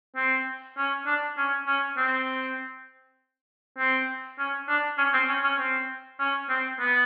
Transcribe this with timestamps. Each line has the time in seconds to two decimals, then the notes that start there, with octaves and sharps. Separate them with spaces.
0.16 C4
0.77 C#4
1.07 D4
1.38 C#4
1.67 C#4
1.97 C4
3.78 C4
4.39 C#4
4.68 D4
4.98 C#4
5.14 C4
5.29 C#4
5.44 C#4
5.59 C4
6.20 C#4
6.49 C4
6.79 B3